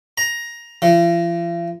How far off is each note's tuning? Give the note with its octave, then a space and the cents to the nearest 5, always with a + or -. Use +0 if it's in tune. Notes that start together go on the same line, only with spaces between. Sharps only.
A#5 +10
F3 -45